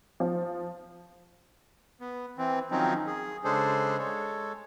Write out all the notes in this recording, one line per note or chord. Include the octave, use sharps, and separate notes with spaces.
F3
B3
E3 C4
D#3 F3 F#3 C4 C#4 D#4
G#4
C#3 G#3 D4 G#4 A4 C5
G#3 A4 C#5